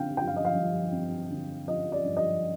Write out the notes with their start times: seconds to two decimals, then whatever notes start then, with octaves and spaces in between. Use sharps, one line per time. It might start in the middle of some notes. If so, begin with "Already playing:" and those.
Already playing: D3 C4 F5 G5
0.17 F3 G5
0.27 F5
0.36 D#5
0.45 F5
0.55 G2
0.92 C4
1.31 D3
1.67 F3 D#5
1.92 D5
2.05 G2
2.17 D#5